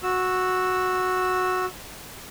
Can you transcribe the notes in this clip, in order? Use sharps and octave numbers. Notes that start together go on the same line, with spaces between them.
F#4 E6